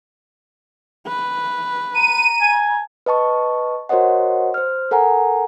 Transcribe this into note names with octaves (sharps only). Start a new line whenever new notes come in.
B4
A#5 D#7
G#5
B4 D#5 A5 C#6
F#4 A#4 C5 C#5 D#5 F#5
C5 F6
A4 A#4 F#5 G#5 A#5